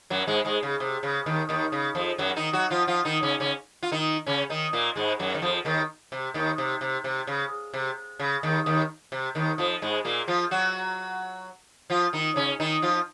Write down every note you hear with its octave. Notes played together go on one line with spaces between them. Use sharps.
F#2 F#3
G#2 G#3
G#2 G#3
C#3
C3
C#3
D#2 D#3
D#2 D#3
C#3
F2 F3
F#2 F#3
D#3 D#4
F#3 F#4
F3 F4
F3 F4
D#3 D#4
C#3 C#4
C#3 C#4
F4
D#3 D#4
C#3 C#4
D#3 D#4
A#2 A#3
G#2 G#3
F#2 F#3
D#3
F2 F3
D#2 D#3
C3
D#2 D#3
C3
C3
C3
C#3
C3
C#3
D#2 D#3
D#2 D#3
C3
D#2 D#3
F2 F3
G#2 G#3
A#2 A#3
F3 F4
F#3 F#4
F3 F4
D#3 D#4
C#3 C#4
D#3 D#4
F3 F4